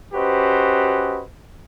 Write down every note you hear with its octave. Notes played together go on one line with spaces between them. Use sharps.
C#4 F#4 G4 B4 C5 D#5